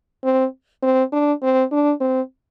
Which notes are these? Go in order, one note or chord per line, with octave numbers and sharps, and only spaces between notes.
C4
C4
D4
C4
D4
C4